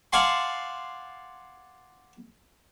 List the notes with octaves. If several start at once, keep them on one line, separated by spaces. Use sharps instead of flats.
D5 F5 F#5 G#5 A5 C6